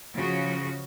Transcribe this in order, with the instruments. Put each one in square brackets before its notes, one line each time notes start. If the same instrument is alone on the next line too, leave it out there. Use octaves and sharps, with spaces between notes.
[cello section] C#3 F3 F#4